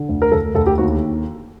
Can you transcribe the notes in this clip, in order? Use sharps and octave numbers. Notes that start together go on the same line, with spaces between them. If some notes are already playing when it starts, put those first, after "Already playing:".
Already playing: D3
D2
A#4
D2 A4
D2 A4
G4
D#2 F#4